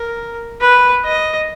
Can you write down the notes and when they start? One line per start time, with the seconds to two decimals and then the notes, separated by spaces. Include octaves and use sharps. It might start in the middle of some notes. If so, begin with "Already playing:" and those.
Already playing: A#4
0.61 B4
1.05 D#5